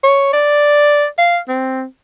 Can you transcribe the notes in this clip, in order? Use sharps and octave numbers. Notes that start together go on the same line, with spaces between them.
C#5
D5
F5
C4